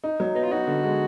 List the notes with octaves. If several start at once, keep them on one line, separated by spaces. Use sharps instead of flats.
D#4
F#3
B3 D#4
F4
D#4 F#4
D3
G#3